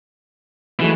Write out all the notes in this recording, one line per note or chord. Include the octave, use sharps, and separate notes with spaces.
E3 F#3 G#3 A3